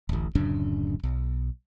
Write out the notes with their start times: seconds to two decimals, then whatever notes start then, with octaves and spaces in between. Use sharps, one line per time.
0.09 D1 A1
0.35 D1 F#2 C#3 D4
1.03 B1